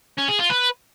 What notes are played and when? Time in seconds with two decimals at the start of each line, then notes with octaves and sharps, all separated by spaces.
0.18 C#4
0.28 G#4
0.39 F4
0.49 B4